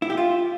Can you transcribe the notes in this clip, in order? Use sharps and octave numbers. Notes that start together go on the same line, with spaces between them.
E4
G4
F4